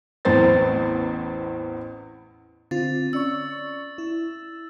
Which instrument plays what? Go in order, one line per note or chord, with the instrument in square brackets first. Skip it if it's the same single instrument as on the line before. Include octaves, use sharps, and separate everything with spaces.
[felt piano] A1 E2 A2 C4 C5 A6
[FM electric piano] D3 C4 F4 [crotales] A6
[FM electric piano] C#4 D5 C#6 [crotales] E6
[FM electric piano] E4